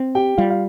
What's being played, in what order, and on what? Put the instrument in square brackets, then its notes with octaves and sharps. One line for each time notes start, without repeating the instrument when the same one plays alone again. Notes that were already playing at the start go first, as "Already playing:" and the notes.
Already playing: [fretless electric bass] C4
[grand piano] G4 G5
[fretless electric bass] G3 [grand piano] F4 F5
[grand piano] F5